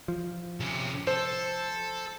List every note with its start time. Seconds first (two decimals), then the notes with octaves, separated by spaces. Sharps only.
0.08 F3
0.60 C3 C#4
1.07 A4 C5